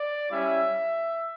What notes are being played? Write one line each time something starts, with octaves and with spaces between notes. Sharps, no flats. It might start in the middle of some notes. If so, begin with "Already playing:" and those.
Already playing: D5
G3 C#4 E4 E5